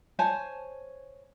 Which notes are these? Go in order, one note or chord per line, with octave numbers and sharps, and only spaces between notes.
C5 C#5 G#5 A5